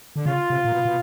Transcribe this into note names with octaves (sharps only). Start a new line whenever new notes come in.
D3
C#3 F4
C3
A#2
B2
B2